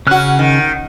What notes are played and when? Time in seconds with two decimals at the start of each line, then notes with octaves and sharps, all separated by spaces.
0.07 C#3 C#4 F#4 F6 F#6
0.39 D#3